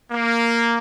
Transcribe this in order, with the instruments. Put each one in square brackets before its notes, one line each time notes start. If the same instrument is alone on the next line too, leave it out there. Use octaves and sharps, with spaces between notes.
[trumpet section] A#3